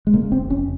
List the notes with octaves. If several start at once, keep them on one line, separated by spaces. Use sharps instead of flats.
G#3
C#3 A#3
F1 C4
F1 C#4